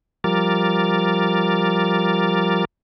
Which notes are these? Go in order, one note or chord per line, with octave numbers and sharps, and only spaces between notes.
F3 G3 A#4 D6 F6 A6